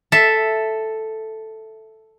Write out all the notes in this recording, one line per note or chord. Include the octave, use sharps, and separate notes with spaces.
A4 E5